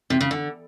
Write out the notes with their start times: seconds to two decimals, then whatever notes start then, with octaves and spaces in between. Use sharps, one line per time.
0.10 C3
0.21 C#3
0.31 D3